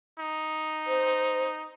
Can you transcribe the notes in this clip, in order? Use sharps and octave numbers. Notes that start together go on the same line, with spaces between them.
D#4
C5